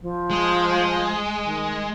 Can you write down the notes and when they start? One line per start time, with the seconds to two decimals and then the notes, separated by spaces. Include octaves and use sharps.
0.02 F3
0.30 G#3
1.44 D#3